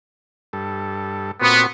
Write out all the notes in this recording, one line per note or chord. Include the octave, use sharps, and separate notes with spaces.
G2 A4
A#2 B3 C4 F#4